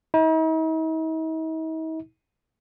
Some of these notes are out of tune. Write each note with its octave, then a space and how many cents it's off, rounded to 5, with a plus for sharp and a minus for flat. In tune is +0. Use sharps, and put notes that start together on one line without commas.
D#4 +45